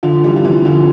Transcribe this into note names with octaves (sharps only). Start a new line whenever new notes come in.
D3 F3
E3 G3
F3
C3 E3
D3 F3